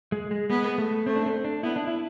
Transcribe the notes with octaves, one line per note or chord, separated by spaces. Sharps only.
G#3
G#3
G#3 B3
A3
A3 C4
D4
C4
D4
B3 E4
D4
E4